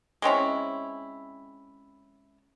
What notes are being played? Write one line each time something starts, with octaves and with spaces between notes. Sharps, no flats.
G#3 C4 C#4 E4